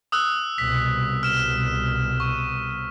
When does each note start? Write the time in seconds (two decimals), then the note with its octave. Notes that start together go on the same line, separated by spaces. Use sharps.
0.12 D#6 E6 F#6
0.58 C2 B2 B6
1.23 F6 E7
2.20 C#6